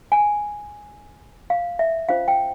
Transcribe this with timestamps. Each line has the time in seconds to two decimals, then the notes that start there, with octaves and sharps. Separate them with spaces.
0.12 G#5
1.50 F5
1.79 E5
2.09 C#4 F4 C5 F5
2.28 G5